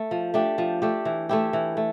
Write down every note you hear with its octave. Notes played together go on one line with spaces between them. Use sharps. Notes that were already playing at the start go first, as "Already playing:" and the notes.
Already playing: A3
F3
A3 D4 G4
F3
A3 D4 G4
E3
A3 E4 G4
E3
A3